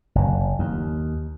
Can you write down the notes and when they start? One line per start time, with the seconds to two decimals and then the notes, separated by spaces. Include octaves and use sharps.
0.15 F#1
0.59 D#2